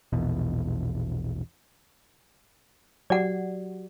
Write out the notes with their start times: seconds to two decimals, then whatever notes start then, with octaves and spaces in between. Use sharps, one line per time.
0.13 A#1 E2 B2
3.10 F#3 F#4 G4 D5 F#5